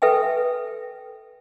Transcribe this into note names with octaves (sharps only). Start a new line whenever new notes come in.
A4 B4 E5 G5 G#5